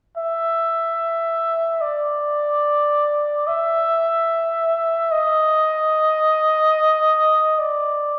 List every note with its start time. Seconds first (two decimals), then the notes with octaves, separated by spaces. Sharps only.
0.18 E5
1.81 D5
3.47 E5
5.12 D#5
7.59 D5